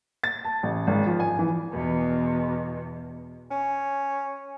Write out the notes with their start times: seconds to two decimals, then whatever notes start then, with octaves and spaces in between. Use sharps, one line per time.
0.24 A6
0.45 A5
0.63 A1
0.87 G#1
1.07 F3
1.20 G#5
1.39 E3
1.72 E2 B2
3.51 C#4